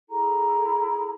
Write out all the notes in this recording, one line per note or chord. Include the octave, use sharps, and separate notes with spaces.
E4 G#4 A4 A#5